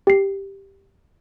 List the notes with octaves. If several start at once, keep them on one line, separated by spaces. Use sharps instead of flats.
G4 C7